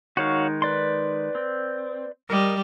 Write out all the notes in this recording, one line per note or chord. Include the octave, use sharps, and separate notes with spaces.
D#3 G#3 D#4 F#4 C#5 F5
B4 D5 C6
C4
G3 A#4 D#5